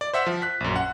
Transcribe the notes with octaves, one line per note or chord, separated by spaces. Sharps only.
D5
C5 E5 F#5
F3
F#6 B6
A#1 F#2
F#5